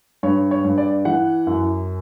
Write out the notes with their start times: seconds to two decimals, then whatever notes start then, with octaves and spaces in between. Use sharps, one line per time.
0.23 G2 C#5
0.51 C#5
0.64 G2
0.78 D5
1.05 E3 F#5
1.47 F#2